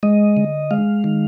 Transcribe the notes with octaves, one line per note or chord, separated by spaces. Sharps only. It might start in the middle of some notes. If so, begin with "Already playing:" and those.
G#3 D#5
D3
G#3 F5
D#3